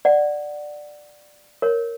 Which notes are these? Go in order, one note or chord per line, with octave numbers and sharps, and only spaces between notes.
D5 F#5
A#4 C#5